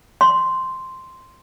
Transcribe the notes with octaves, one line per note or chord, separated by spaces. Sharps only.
C6